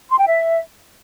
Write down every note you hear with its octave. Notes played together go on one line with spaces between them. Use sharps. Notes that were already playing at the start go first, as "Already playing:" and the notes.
C6
G5
E5